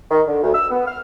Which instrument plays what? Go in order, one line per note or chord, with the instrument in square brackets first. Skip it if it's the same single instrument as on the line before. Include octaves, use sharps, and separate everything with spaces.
[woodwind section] D#3
D3
D2
E6
B3
F6